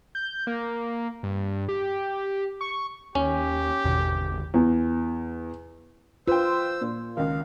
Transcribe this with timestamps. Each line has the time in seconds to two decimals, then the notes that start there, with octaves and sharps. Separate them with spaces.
0.15 G6
0.47 A#3
1.23 G2
1.69 G4
2.61 C#6
3.15 D#2 C#4 G4
3.84 G#1 E2 B2 D3
4.54 E2
6.28 F4 B4 C5 G5 E6
6.81 A#2
7.17 C#2 D#3 F5